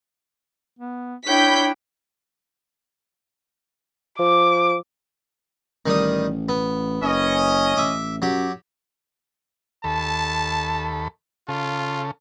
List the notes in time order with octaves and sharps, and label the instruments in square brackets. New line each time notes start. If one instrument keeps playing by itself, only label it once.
[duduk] B3
[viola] D4 E4 [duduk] C#5 [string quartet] G5 [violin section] B5 G6 B6
[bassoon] F3 [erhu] D6
[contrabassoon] A1 [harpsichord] D#3 G3 D#6
[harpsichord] B3
[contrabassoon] F#1 [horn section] C#4 D#5
[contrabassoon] A1 [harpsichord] E5 D6
[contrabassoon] F#2 [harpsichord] F#3 G4
[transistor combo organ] D#2 A4 B5 [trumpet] A5
[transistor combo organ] C#3 A4 [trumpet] F4